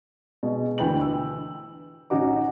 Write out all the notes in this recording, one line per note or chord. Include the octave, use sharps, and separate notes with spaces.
B2 G#3
D2 E3 B4 G5 F#7
E6
A1 C#4 D#4 F#4 D6